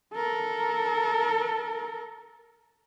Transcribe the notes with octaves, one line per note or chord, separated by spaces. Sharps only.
A4 A#4